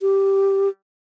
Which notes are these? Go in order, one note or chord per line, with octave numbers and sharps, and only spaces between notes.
G4